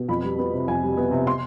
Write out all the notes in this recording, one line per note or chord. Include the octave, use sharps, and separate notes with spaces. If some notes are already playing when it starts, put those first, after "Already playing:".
Already playing: B2
F2 B5
G3
B3
C3
F2 G#5
G3
B3
C3
C6